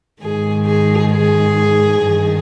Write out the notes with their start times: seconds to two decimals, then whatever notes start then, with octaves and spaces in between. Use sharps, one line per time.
0.21 G#2 D#3 G#4
0.66 G#4
1.11 G#4
2.02 G2 D#3